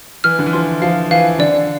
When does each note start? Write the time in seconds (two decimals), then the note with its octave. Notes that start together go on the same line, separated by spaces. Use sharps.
0.24 E3 F6
0.39 D3
0.46 E3
0.53 F3 C6
0.82 F3 F5
1.11 E3 F5
1.39 D3 D5